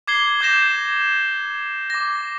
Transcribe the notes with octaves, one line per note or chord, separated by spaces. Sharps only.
D6 G#6 C7 G7
D6 G6 G#6 A#6 E7
D6 A#6